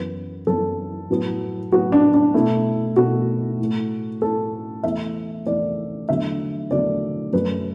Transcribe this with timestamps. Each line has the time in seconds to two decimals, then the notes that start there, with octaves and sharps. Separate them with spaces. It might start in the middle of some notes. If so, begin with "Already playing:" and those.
Already playing: F#2 E3 B3 B4
0.47 F#2 E3 B3 A4
1.10 A2 F#3 B3
1.72 A2 F#3 B3 F#4
1.92 D4
2.14 D4
2.34 B2 A3 E4
2.96 B2 A3 F#4
3.59 A2 A3
4.21 A2 A3 A4
4.83 E2 E3 A3 E5
5.46 E2 E3 A3 D5
6.08 E2 D3 F#3 A3 E5
6.71 E2 D3 F#3 A3 D5
7.33 F#2 F#3 A3 B4